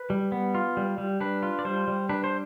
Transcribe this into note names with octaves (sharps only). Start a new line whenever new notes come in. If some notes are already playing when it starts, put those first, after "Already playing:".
Already playing: B4
G3
B3
F4
G3
G3
D4 B4
F4
D5
G3 C5
G3
D4 B4
C5